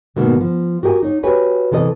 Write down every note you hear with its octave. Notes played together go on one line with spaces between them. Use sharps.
G#2 B2 D#3 A#3
F3
F#4 G4 A#4 F#5 G#5
D#4 C#5
F#4 G4 B4 C#5 G#5
C3 E3 A4 A#4 D#5